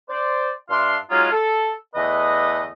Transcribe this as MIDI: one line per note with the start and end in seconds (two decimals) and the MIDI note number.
0.09 0.50 72
0.09 0.50 74
0.70 0.96 43
0.70 0.96 62
0.70 0.96 76
0.70 0.96 77
0.70 0.96 84
1.11 1.31 54
1.11 1.31 56
1.11 1.31 61
1.11 1.31 63
1.11 1.31 65
1.32 1.70 69
1.95 2.69 40
1.95 2.69 50
1.95 2.69 57
1.95 2.69 71
1.95 2.69 75